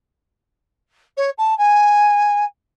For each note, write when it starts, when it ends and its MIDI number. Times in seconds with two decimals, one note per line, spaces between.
1.17 1.30 73
1.38 1.56 81
1.58 2.45 80